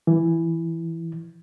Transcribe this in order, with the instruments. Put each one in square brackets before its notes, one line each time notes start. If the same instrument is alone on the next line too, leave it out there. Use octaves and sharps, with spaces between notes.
[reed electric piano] E3